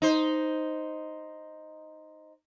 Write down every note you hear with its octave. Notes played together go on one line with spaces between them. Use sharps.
D#4 C5